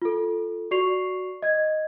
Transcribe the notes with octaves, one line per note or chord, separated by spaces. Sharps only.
F4 A4
F#4 D5 C#6 C7 F7
D#5 G#6